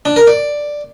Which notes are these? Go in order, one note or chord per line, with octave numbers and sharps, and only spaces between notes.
D4
A#4
D5